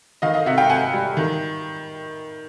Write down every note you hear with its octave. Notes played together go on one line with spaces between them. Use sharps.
D#3 D#5 F5
D#5 F5
C3 E5 F#5
F5 G5
C3 F#5 G#5
G3
D#3